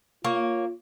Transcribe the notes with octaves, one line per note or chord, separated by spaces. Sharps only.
A#3 F4 C#5